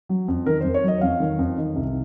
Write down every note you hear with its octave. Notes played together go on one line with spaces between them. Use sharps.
F#3
F2
D#3 A#4
F2 C5
C#5
F#3 D#5
F2 F5
D#3
F2
D#3
C2